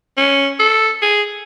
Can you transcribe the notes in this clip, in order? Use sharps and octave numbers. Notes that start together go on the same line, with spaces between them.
C#4
A4
G#4